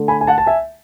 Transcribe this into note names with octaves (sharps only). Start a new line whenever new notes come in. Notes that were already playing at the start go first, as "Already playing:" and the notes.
Already playing: D3 A3
G#5 B5
G#5
F#5 A5
A5
E5 G#5